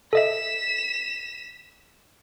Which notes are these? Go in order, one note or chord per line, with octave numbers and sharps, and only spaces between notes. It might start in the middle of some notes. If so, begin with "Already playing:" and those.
A4 D#5 E5 B6 E7